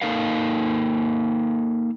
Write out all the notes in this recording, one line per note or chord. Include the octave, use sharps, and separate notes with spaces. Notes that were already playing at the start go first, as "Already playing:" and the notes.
A#3 D#4 A4 A#4 F5